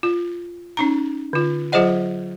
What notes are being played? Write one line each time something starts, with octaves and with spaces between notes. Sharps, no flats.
F4
C#4 D#4 A#5
D3 F4
F#3 F4 G#4 C5 D#5 F#5